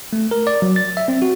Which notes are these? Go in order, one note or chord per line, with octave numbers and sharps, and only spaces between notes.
A3
A#4
D5
F#3
A6
E5
C4
F#4